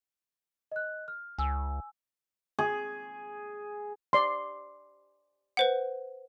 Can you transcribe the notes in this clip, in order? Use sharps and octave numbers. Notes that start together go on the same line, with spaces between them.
D#5 F#6
F6
C#2 G#5 E6
G#4
D5 C6
B4 C5 F#5